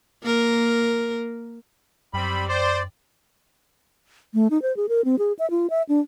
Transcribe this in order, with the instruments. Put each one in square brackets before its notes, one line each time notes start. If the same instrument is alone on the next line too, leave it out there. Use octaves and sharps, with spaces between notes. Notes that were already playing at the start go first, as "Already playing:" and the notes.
[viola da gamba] A#3 A#4
[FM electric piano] F#2 G5 [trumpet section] G3 C4 [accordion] B5
[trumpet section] C5 [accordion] D5
[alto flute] A3
D#4
C5
G#4
A#4
C4
G#4
E5
F4
E5
D4